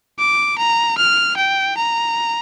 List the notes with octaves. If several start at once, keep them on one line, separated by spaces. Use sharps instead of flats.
D6
A#5
F6
G5
A#5